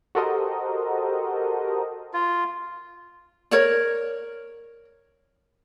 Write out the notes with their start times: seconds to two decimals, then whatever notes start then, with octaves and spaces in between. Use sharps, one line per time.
0.15 F#4 G4 A4 A#4 C5 D#5
2.14 F4
3.51 A#4 C#5 D5